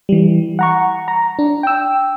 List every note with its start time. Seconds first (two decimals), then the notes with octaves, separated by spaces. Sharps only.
0.09 E3 G3
0.59 F#5 A#5 C#6
1.08 A#5
1.39 D4
1.63 G5 E6